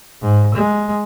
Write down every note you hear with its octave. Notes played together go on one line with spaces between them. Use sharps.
G#2
G#3